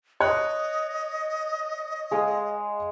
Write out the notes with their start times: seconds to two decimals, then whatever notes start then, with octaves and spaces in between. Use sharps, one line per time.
0.20 C#5 D#5 F#6
2.11 G#3 F5 D#6